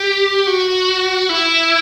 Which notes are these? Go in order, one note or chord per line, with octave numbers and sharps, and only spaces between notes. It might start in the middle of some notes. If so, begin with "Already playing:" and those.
Already playing: G4
F#4
E4